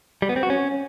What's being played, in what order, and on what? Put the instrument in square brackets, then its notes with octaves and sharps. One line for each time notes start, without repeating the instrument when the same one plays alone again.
[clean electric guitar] G3
B3
C4
F#4
C#4